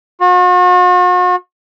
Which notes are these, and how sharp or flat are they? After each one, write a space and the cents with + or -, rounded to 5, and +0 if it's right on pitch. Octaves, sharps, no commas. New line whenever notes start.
F#4 -45